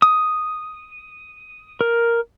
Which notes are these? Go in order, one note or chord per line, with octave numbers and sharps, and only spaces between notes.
D#6
A#4